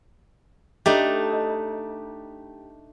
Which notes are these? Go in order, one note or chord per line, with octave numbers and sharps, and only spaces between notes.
A3 D4 D#4 G4